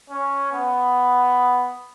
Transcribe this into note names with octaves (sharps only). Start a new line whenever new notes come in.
C#4
B3